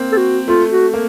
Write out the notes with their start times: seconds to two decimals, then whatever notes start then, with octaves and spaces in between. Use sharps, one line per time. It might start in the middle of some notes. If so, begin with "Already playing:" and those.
Already playing: A#3 C4
0.12 A4
0.17 F#4
0.48 A3 F4
0.71 F#4
0.94 A#3